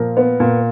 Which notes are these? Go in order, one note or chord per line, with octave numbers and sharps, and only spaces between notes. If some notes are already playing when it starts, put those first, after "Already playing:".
Already playing: A#2 F3 A#4
B3
A#2